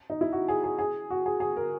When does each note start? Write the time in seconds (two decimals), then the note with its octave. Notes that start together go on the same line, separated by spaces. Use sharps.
0.10 D#4
0.21 E4
0.32 F#4
0.48 G#4
0.64 G#4
0.79 G#4
1.10 F#4
1.26 G#4
1.40 G#4
1.57 A#4